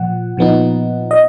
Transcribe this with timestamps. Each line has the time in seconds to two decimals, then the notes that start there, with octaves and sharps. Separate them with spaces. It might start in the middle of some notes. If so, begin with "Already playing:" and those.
Already playing: A#2 F3 F#5
0.37 A#2 F3 B3 D#4
1.11 D#5